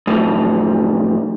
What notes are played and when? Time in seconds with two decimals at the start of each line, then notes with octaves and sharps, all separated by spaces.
0.07 F#2 A2 F3